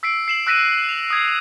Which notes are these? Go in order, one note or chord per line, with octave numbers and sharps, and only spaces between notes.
E6 B6 C7 D7
C7 E7 F#7
E6 F#6 A#6 B6 D#7 E7
F7
D#6 G#6 C7